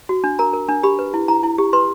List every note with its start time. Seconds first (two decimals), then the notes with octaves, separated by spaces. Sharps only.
0.09 F#4
0.24 D4
0.39 A#4 A#5
0.53 A#4
0.69 D4
0.83 G4 B5
0.99 B4
1.14 E4
1.28 E4 A#5
1.43 E4
1.58 G4
1.73 B4 C6